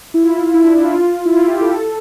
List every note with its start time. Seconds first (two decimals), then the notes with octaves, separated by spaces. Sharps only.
0.14 E4
0.23 F4
0.44 E4
0.54 E4
0.63 D4
0.73 E4
0.84 F4
1.25 E4
1.34 F4
1.47 G4
1.61 A4